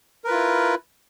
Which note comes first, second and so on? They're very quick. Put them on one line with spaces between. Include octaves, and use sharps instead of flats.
A#4 B4 F4 E4